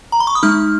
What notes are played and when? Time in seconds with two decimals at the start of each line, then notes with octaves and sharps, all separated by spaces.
0.12 A#5
0.20 B5
0.27 C#6
0.35 D#6
0.43 G#3 D#4 F6